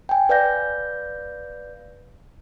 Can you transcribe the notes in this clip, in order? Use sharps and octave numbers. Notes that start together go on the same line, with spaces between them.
G5 G#5
B4 D5 F5 G6 A#6